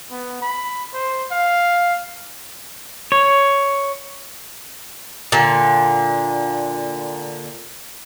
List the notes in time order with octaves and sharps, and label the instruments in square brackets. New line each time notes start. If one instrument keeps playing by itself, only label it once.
[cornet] B3
B5
C5
F5
[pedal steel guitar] C#5
[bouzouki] A#2 D3